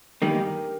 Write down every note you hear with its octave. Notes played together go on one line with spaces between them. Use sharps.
E2 D#3 G3 A#3 D#4 G4
A#4